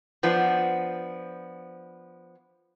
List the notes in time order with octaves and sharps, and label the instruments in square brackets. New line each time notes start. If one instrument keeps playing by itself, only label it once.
[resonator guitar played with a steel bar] F3 B3 D4